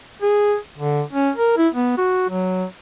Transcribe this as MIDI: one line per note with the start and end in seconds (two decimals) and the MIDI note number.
0.22 0.56 68
0.78 1.02 50
1.13 1.30 61
1.36 1.54 70
1.57 1.69 64
1.74 1.97 59
1.98 2.28 66
2.29 2.65 54